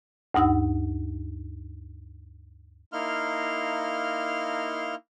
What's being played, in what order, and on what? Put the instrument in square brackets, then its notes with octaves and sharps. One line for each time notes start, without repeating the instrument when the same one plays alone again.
[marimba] D2 G2 D#4 F#5 E6
[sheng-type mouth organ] A#3 D#4 E4 F5 C6 F6